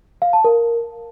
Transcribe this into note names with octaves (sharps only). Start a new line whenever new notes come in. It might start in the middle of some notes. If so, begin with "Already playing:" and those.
F5
A5
A#4